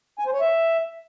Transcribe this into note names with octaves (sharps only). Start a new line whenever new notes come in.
G#5
C5
C#5
E5